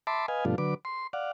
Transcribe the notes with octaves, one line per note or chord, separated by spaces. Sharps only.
E5 A5 B5 C6 D6
B4 D#5 F5 G#5
G2 B2 F3 A3 D4 F4
D3 F#3 B4 D6
C6
D5 F5 F#5